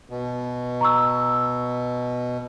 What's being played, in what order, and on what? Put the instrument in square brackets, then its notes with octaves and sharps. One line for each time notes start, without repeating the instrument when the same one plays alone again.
[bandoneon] B2
[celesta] A#5 C#6 E6